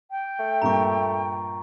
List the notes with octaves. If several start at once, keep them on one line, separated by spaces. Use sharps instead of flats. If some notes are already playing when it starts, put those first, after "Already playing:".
G5
A3
G2 A#2 A#3 A#5 C#6